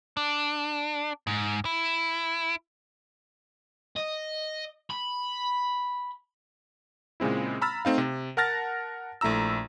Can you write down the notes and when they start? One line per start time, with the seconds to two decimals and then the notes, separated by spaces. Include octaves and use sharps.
0.17 D4
1.27 G#2
1.65 E4
3.96 D#5
4.91 B5
7.20 A#2 C#3 G#3 C4 E4
7.62 A#5 B5 E6 F6 A6
7.85 A3 C4 D#4 F5
7.98 C3
8.37 A#4 F#5 A5 F6 A6 A#6
9.21 A#1 A3 E4 A#5 E6